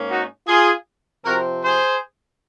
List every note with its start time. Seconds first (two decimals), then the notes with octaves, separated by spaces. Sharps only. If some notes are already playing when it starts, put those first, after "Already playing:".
Already playing: G#2 A#3 C#4
0.09 D#4 F#4
0.47 F4 G#4
1.25 C3 F3 C4 F#4 A#4
1.63 G#4 C5